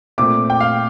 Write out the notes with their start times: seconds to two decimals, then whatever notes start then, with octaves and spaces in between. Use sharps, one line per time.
0.18 A#2 A3 C4 D6
0.50 G5
0.60 F5